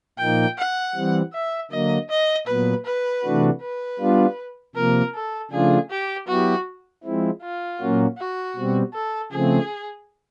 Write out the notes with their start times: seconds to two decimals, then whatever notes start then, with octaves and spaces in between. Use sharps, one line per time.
0.19 A#2 F3 A#3 D#4 G5
0.58 F#5
0.95 E3 G3 C4
1.33 E5
1.71 D3 F#3 A#3 D#5
2.09 D#5
2.47 A#2 F#3 B3 B4
2.85 B4
3.23 C3 E3 A3 D4 F#4
3.61 B4
4.00 G3 B3 D4 F4
4.75 C3 F3 A#3 A#4
5.14 A4
5.51 C#3 F3 A3 D4 F4 G#4
5.90 G4
6.28 F#3 B3 E4 F#4 G4
7.04 F3 G#3 C4 E4
7.42 F4
7.80 A#2 F#3 A#3 C#4 F#4
8.18 F#4
8.56 B2 G3 C4
8.94 A4
9.32 C#3 F3 A3 C4 G#4